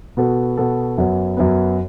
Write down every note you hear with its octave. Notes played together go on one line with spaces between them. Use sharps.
B2 B3 F#4 A4
B2 B3 F#4 A4
F#2 F#3 B3
F#2 F#3 B3